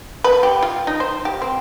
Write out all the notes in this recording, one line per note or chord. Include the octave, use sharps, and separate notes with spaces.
B4
G4
F4
D#4
C5
G4
C4